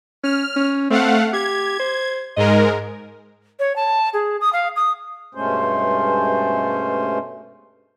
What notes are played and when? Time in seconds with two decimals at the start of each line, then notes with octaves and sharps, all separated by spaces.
0.23 C#4 F6
0.56 C#4
0.90 A3 C4 F5 F#5
1.33 G4 G#6
1.80 C5
2.37 G#2 G#3 A#4 D#5
3.59 C#5
3.76 A5
4.14 G#4
4.41 D#6
4.53 F5
4.76 D#6
5.35 G2 B2 G#3 A3 C#4 C5